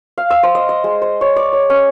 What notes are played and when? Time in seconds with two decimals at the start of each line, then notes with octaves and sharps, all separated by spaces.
0.18 F5
0.30 E6
0.43 C5
0.55 D#5
0.69 D#5
0.84 G#3
1.02 C5
1.21 C#5
1.36 D5
1.53 C#5
1.70 C#4